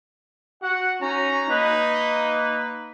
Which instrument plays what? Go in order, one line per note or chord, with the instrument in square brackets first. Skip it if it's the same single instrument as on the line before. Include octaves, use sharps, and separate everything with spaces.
[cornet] F#4 [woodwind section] F#5
[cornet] C#4 [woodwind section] D#4 F#4 A#5
[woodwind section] A#3 B4 [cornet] D#4